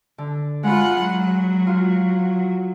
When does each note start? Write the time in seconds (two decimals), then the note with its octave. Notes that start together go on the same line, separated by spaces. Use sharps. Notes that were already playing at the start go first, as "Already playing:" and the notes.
0.18 D3
0.63 G#3 F4 F#5 B5
1.01 F#3
1.67 F4 F#4